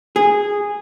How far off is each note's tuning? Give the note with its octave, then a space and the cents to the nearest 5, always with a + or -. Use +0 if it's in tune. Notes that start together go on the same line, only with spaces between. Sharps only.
G#4 -10